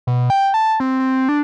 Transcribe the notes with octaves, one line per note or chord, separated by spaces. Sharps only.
B2
G5
A5
C4
C4
D4